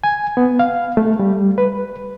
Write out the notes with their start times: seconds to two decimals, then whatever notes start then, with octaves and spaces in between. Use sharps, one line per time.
0.04 G#5
0.37 B3
0.59 F5
0.97 A3
1.19 G3
1.58 B4